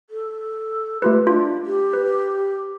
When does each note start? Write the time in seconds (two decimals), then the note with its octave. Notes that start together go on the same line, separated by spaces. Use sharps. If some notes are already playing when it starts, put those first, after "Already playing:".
0.10 A4
1.02 A3 F4 G4 B4
1.27 D4 F4
1.66 G4
1.93 B4